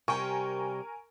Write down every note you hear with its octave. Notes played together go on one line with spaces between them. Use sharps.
C3 G3 A#4 G5 G#5 C#6